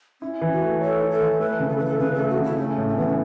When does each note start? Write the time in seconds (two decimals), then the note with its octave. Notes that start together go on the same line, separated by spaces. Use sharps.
0.21 C#4 E4
0.41 E3
0.51 F#4
0.61 A3
0.81 A4 C#5
1.00 E4
1.10 A4
1.21 E3
1.40 A3 B4
1.60 C#3
1.69 A4
1.78 E3 B4
1.86 A4
1.99 C#3 B4
2.14 A4
2.19 A3
2.29 F#4
2.39 C#3 E4
2.58 A3 C#4
2.78 A2
2.88 C#4
2.97 E3 B3
3.07 C#4